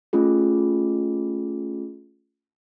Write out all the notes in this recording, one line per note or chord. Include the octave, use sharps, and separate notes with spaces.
A3 C#4 F4 G#4